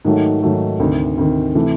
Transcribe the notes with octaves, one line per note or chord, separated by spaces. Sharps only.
G#2 D#3 F#3 A3
G#2 D#3 F#3 A3
D2 C3 D#3
D2 C3 D#3
C3 E3 A3